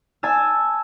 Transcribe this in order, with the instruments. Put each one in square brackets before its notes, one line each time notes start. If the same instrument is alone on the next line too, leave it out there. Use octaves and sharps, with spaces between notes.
[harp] G#5 A5 E6